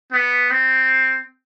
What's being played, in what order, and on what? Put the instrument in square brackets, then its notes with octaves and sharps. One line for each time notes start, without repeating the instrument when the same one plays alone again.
[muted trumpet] B3
C4